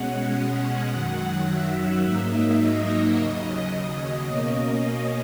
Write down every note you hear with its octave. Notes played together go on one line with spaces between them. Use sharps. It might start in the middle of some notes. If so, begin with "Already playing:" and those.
Already playing: B2 G#3 C#4 F#5
F#2 D#3 F#3
E5
G#2 F#3 A#3 D#4
D#5
D#2 C#3 F#3
D#5
B2 A#3 C#4 D#5